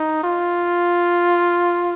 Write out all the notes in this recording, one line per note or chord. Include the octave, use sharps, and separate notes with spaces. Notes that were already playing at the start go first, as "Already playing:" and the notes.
Already playing: D#4
F4